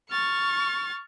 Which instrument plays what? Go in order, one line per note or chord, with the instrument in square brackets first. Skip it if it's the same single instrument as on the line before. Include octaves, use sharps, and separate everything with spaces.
[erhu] C#6 [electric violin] F6 A6